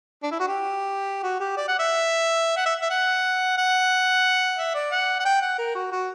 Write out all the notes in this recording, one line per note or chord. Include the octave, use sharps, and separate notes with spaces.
D4
E4
F#4
G4
F#4
G4
D5
F#5
E5
F#5
E5
E5
F#5
F#5
E5
D5
F#5
F#5
G5
F#5
A#4
F#4
F#4